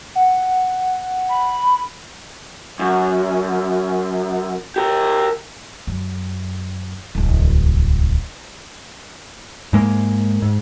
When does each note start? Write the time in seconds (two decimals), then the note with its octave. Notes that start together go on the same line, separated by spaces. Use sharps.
0.15 F#5
1.30 B5
2.79 F#2
4.76 G4 A#4
5.87 F#2
7.15 D1 C2
9.73 G#2 G#3 A#3
10.42 G#2